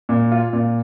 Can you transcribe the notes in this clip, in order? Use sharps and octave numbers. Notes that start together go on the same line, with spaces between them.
A#2
F4
A#2